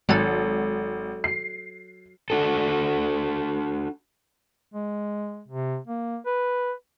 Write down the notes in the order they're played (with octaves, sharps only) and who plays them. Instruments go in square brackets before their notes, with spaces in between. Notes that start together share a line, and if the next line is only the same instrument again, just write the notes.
[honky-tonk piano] G#1 [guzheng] F#3 A4
[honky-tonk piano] C7
[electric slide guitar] D4 F#4 A4
[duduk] G#3
C3
A#3
B4